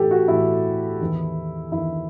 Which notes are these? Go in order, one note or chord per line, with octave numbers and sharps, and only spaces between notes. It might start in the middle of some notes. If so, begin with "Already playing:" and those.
Already playing: A2 E3 G4 A4
F#4
A2 E3 E4
E2 D#3
E2 D#3 E4